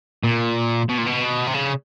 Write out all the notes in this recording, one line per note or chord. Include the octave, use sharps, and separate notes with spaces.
A#2
B2
A#2
B2
C3
C#3